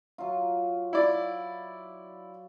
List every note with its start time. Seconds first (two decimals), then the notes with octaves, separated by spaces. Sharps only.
0.18 F#3 F4
0.93 E4 D5